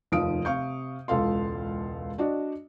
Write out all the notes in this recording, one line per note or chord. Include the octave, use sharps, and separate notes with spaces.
F1 D#2 F3 F5 D#6 D7
C3 F5 C#6 G6
E1 C#2 F4 A4 F5 C6
D4 F#4 D5 D#5